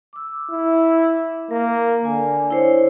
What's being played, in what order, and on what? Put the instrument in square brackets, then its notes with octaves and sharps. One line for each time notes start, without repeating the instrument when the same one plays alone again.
[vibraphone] D6 E6
[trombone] E4
[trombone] A#3 [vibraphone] A#4
[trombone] D3 [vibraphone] G#5
[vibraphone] E4 C5 C#5